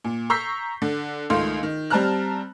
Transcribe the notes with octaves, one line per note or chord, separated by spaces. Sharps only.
A#2
A#5 C#6 E6 G6 B6 C7
D3
C#2 D#3 A3 F5 C6
D#3
G3 C4 A5 A#5 F6 F#6